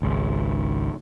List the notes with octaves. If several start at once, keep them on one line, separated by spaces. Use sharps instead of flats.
G#1 C#2